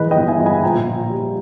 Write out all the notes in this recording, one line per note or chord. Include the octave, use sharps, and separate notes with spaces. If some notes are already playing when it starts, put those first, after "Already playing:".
Already playing: E3 G#3 B4 D#5
D#5 G5
G1
E5 G#5
G1
G#5 B5
A#1 G5 A#5
A#1
G3